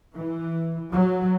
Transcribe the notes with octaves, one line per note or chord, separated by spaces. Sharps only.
E3
F#3